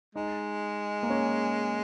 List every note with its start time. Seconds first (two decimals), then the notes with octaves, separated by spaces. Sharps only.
0.15 G#3 D#4
1.03 A#3
1.10 C#4